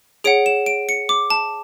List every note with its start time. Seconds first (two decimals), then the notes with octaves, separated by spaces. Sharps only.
0.24 G#4 C#5 F#5 D7
0.46 E7
0.66 D7
0.89 C#7
1.09 D6
1.30 A5